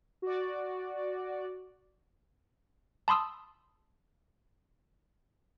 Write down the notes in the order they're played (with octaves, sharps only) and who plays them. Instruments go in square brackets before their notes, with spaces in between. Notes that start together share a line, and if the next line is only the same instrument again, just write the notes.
[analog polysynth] F#4 D5
[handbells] A5 B5 C6 D#6 E6